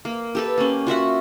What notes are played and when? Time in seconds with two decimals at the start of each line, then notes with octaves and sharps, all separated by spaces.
0.05 A#3
0.35 G4 A4 B4
0.58 A#3 C#4
0.87 F4 F#4 E5 F#5